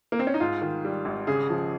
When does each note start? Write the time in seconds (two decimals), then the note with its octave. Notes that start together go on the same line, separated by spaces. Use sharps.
0.12 A#3
0.19 C4
0.27 C#4
0.34 D#4
0.40 G#2 F4
0.62 D#3
0.85 G3
1.05 G#1
1.27 C#3 G#4
1.50 F3